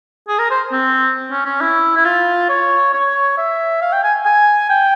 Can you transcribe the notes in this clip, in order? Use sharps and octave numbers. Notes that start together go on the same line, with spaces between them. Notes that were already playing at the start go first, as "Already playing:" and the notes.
G#4
A#4
C5
C4
C#4
C#4
E4
E4
F4
C#5
C#5
E5
F5
G5
G#5
G#5
G5